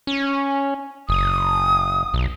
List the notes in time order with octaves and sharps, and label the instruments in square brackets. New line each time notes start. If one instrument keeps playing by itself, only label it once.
[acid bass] C#4
[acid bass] F#1 [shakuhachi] D#6
[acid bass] B1